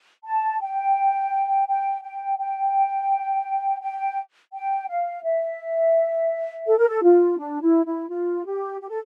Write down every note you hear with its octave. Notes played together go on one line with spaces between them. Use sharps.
A5
G5
G5
G5
G5
G5
G5
F5
E5
A4
A#4
A4
F4
D4
E4
E4
F4
G4
G4
A4